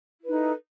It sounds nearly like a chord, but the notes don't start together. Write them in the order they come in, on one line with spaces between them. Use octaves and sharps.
E4 B4 D#4 A4